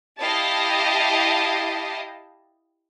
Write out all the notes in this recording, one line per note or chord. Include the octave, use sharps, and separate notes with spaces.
E4 G4 D#5 F5 A5